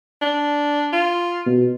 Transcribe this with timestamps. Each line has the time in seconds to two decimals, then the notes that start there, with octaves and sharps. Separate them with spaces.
0.21 D4
0.93 F4
1.46 B2